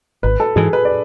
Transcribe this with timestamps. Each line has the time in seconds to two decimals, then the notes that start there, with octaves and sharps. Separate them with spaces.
0.23 G#1 B4
0.40 A4
0.56 G#2 E3 G#4
0.73 B4
0.85 D5